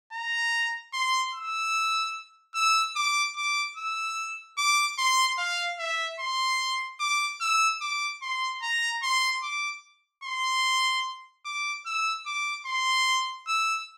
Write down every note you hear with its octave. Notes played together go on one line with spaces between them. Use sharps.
A#5
C6
E6
E6
D6
D6
E6
D6
C6
F5
E5
C6
D6
E6
D6
C6
A#5
C6
D6
C6
D6
E6
D6
C6
E6